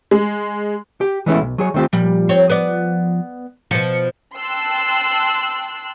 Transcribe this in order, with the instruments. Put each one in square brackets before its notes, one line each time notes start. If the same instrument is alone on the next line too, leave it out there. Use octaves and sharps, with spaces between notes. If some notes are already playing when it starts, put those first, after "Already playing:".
[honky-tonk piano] G#3
[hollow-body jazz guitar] G4
E3 G#3 A3 B3 C#4 E4
B1
F#3 G#4 C#5
D#3 A3 C4 F4 G4
[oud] A#2 G3 [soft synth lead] F3
[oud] C4 C#5
B3 D5
[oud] B2 F3 [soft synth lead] C#7
[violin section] G5 A5 C6 E6 F#6